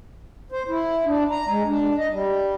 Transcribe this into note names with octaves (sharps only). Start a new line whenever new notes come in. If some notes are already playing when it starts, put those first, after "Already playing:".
C5
E4
D4
A#5
G#3
D4
D#5
G3